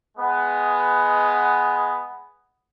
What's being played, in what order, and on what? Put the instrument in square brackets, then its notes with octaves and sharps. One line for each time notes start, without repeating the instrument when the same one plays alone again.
[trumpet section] G#3 B3